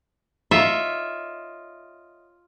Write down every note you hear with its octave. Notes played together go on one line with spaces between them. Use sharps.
F4 C#5 D#5 E5